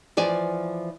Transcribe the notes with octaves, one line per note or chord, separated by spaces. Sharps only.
E3 F3 D5 G#5